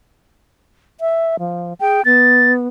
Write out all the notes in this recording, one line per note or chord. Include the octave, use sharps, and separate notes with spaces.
E5
F3
G#4 G5
B3 A6